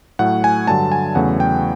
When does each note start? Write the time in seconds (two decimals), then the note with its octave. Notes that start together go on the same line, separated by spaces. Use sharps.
0.19 A2 F#3 A3 F#5
0.44 G#5
0.68 G2 D3 F#3 A5
0.92 G#5
1.15 E2 C#3 F#3 A3 F#5
1.40 G5